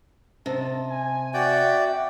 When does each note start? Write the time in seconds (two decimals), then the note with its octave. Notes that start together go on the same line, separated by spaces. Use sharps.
0.46 C3 D#5 A5
0.90 G#5
1.34 F#4 D5 E5 G5